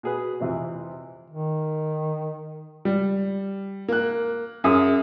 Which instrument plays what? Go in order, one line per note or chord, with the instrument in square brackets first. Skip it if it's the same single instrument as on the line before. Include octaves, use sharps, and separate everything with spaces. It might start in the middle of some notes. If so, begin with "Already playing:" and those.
[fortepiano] B2 G#4 B4
F2 C3 E3
[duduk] D#3
[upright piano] G3
A#3 F#6
F#2 G#4 E5 D#6